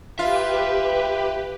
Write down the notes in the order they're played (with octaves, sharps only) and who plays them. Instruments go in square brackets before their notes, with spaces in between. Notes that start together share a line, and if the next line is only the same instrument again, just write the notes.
[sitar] F4 [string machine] G4 B4 [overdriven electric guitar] E5